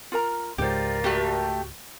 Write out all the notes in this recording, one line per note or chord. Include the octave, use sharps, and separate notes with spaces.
F4 A#4 A#5
C#2 G#2 F4 G4 A#4 C5 D5
A3 F#4 G4